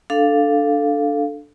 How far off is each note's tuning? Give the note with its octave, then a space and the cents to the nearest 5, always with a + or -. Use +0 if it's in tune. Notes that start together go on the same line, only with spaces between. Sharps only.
D4 +0 A4 +0 F5 +0